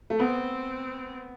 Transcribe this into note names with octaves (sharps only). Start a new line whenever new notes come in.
A3
B3 C4